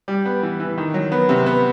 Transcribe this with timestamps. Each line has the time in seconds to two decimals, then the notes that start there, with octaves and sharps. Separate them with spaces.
0.08 G3
0.25 B3
0.43 E3
0.60 E3
0.78 D#3
0.94 F#3
1.12 B3
1.29 C3
1.46 B3